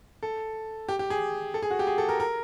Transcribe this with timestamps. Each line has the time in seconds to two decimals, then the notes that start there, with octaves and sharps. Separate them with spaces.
0.23 A4
0.89 G4
0.99 G4
1.10 G#4
1.54 A4
1.62 G#4
1.71 F#4
1.79 G4
1.87 G#4
1.98 A4
2.09 A#4
2.20 A#4